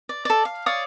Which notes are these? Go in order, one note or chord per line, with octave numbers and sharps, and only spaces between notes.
D5
A4 D5
F5
C#5 D5 F5 D#6